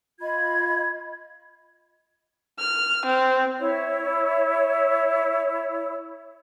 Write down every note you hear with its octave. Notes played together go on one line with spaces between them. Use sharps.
F4 D#5 B5 G#6
F6
C4
E4 C#5